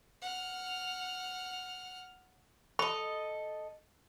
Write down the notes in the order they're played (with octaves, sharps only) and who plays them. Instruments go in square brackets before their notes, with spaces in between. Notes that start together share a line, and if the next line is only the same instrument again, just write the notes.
[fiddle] F#5 F6
[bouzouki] A4 D#5 [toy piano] B5